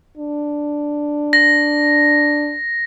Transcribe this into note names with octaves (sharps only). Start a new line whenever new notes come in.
D4
A#6